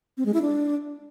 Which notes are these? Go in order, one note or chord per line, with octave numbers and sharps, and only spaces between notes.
C4
G#3
E4
D4